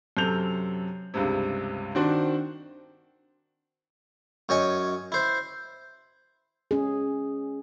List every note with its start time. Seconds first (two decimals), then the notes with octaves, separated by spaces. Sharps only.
0.17 F#2 C3 A4 G6 F7
1.14 C#2 G2 C3
1.95 D#3 C4 D4 F#4 C5
4.49 F#2 C#5 D#5 G#5
5.12 E4 C5
6.71 C#4 G#4